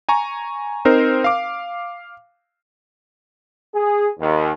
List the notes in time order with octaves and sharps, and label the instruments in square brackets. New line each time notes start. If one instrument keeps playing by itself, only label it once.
[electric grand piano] G#5 A#5 C#6
C4 D#4 A#4 C5
F5 D6
[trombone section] G#4
D#2